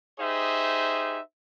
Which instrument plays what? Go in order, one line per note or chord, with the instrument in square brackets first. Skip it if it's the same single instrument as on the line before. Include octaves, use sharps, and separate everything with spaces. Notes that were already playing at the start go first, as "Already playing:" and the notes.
[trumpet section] D#4 G4 G#4 C5 E5